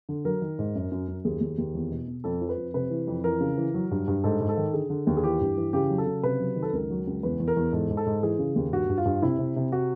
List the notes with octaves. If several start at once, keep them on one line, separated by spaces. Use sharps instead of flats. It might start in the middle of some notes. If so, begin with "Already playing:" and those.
D3
F#3 A#4
D#3
G#2
F#2
F#2
F#2
D#2 G#4
D#2
D#2
E2
B2
B2
F2 A4
F3
B4
F2
C3 B4
E3
F2
E3 A#4
C#3
E3
F#3
G2
G2
G#2 A4
G#2
A4
D#3
D3 G#4
D3
D#2
G#4
E3 G4
G2
E3
C#3 G4
F#3
A4
C#3
C3 B4
F#3
D#3
A4
C#2 A#4
F#3
C#2
E2 B4
E2
A#4
E2
G#2 A4
G#2
A4
G#2
E3 G#4
C#3
D#2
G2 F#4
G2
F4
G2
C3 E4
C3
C3
F#4